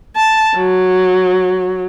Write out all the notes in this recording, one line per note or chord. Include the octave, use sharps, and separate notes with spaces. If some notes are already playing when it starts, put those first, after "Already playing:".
A5
F#3